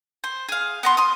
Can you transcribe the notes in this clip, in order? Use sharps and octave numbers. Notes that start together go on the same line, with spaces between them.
C5
G#4 F5
B3 A#5 C6
C6 D#6